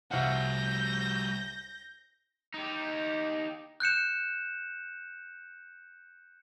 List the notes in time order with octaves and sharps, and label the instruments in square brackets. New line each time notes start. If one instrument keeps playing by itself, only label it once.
[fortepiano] C2 F5 F#5 [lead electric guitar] G3 F#4 [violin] G6 A#6
[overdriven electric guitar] D#4 G4
[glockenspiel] F#6 G6 C#7 E7